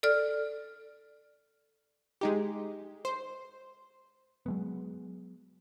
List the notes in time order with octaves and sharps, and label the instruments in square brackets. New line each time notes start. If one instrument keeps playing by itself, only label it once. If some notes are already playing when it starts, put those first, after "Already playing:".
[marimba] A4 D5 F6
[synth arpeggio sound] G#3 D#4 G4
C5
[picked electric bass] F#3 G#3 B3